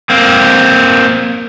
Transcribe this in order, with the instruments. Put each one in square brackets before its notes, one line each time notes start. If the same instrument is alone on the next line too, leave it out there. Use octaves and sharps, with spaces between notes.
[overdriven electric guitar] A#3 C4